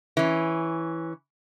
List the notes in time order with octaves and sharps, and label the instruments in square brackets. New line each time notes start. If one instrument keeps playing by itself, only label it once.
[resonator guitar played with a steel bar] E3 C#4